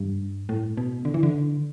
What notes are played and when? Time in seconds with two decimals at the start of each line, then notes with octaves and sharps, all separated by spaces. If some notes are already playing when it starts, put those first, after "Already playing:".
Already playing: G2
0.49 A2
0.77 B2
1.05 D3
1.14 E3
1.23 D3